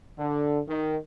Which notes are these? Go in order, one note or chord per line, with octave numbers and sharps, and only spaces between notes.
D3
D#3